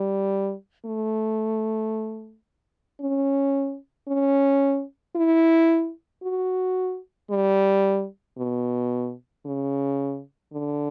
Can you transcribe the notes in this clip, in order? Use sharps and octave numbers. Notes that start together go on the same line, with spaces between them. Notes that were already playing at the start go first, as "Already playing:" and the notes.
Already playing: G3
A3
C#4
C#4
E4
F#4
G3
B2
C#3
D3